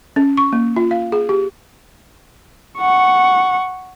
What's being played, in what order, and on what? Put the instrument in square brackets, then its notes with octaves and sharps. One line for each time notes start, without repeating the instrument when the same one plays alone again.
[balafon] C#4
C#6
A#3
F4
F5
G#4
G4
[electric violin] F#5 C#6